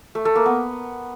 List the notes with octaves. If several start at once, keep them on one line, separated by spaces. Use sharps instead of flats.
A3
A3
A#3
B3